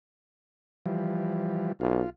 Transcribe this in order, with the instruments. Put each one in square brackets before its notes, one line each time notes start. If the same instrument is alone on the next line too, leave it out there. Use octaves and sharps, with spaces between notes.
[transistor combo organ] E3 F3 G3
[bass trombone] B1 [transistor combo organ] F4